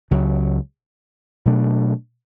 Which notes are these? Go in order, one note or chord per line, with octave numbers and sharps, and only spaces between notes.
C#2 C#3 F#3
B2 F#3 A3 D4